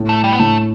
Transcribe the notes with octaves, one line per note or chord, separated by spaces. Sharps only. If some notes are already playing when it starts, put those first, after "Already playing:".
Already playing: A2
A3
G3
B3
A2 A3